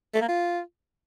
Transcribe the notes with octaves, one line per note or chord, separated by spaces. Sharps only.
A3
A#3
F4